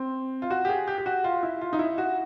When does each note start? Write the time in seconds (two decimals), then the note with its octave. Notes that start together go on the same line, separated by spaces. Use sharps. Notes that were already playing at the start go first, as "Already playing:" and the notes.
Already playing: C4
0.42 F4
0.50 F#4
0.65 G4
0.69 G#4
0.87 G4
0.98 G4
1.06 F#4
1.24 F4
1.43 E4
1.61 F4
1.73 D#4
1.79 E4
1.98 F#4